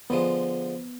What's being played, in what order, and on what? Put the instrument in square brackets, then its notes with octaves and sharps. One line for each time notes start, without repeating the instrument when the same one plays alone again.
[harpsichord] D3 F3 G#3 [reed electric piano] B3